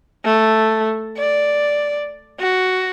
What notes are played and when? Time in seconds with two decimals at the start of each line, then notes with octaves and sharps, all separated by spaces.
0.25 A3
1.17 D5
2.39 F#4